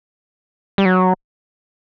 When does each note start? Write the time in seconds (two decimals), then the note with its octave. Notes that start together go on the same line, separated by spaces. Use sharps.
0.78 G3
0.85 F#3